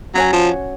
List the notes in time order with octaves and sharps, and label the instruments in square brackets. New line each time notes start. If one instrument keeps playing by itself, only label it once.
[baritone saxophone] F#3 [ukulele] C#4 F#4 C#5 G#5
[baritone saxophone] F3